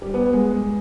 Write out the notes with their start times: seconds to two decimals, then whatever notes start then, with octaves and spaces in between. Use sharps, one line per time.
0.02 G3
0.14 B3
0.33 G#3